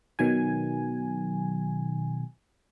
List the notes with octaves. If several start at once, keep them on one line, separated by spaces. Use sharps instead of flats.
B2 D#3 F#3 G#5